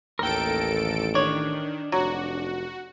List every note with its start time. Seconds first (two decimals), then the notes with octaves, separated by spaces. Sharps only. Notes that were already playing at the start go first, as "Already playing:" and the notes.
0.19 A1 D#2 A4 A#4 G5 D7
1.15 D#3 D4 C#5
1.92 F1 F#3 F#4